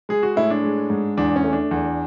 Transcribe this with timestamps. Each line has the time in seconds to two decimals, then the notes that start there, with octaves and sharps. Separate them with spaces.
0.09 G#3 G#4
0.23 F#4
0.36 A2 E4
0.50 D4
0.64 G#3
0.90 G#2
1.17 E2 D4
1.36 C#4
1.44 A3
1.53 D4
1.71 E2